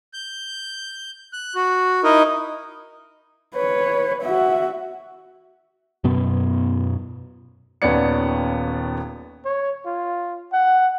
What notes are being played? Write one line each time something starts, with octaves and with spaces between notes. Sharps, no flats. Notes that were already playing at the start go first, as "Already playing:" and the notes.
G6
F#6
F#4
D#4 E4 A#4 D#5
B4 C#5
F#4 E5
F#2 B2 B3
D#1 D#2 B3 C#4 D5 C#7
C#5
F4
F#5